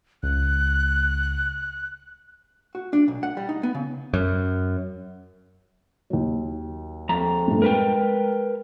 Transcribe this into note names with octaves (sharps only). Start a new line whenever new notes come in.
C#2 F#6
F#4
D4
B1
F#5
G3
D#4
B3
C#3
F#2
D#2 F#3
F2 A#5
G2 A#2 A3
G#3 A#4 B4 G5